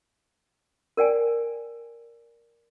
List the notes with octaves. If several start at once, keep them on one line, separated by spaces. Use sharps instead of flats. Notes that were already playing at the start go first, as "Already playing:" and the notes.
A#4 D5 G5 G#5